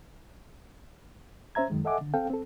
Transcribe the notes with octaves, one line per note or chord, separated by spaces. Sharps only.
C#4 C5 E5 A#5 G#6
F#2 D#3 G#3
A4 D#5 E5 F#5 G#5 D6
D3
C4 A4 F5 G5
C4 A4